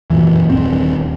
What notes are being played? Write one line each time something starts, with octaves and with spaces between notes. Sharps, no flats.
F#2 A#2 E3
D#1 C4